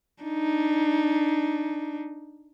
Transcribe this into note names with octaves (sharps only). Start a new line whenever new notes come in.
D4 D#4